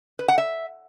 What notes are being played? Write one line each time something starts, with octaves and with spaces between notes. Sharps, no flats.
B4
F#5
E5